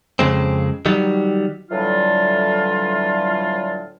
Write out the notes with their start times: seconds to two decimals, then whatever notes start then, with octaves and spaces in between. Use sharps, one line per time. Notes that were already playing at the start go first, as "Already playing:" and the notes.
0.19 F2 C#3 G#3 C4
0.86 D#3 F#3 G3
1.70 A2 D3 E3 F#3 G3 F4